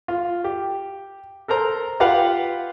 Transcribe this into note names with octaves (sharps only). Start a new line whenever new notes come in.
F4
G4
A4 A#4 C5 A#5
F4 G4 B4 F5 F#5